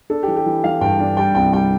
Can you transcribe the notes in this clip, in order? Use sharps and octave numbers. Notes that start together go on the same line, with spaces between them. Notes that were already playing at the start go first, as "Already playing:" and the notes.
D4 A4
G4
E3
G4
E3
E3 F5
G2 G5
D4
G3 G5
C2 G5
G3 G5